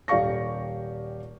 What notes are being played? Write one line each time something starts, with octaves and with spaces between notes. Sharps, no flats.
D#1 G4 D5 F5 C#6 A#6